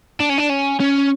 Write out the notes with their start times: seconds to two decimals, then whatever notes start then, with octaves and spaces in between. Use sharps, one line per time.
0.20 D4
0.30 C#4
0.38 D4
0.50 C#4
0.80 C#4